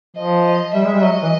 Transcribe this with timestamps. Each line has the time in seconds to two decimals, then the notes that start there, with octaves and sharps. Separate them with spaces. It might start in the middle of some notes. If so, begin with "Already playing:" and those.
0.16 F3 D#5
0.45 D#5
0.74 G3 E5
0.84 G#3
0.94 G3
1.03 F#3 D#5
1.23 E3